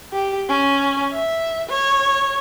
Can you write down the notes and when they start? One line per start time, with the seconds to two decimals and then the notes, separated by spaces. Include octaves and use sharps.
0.13 G4
0.49 C#4
1.13 E5
1.69 C#5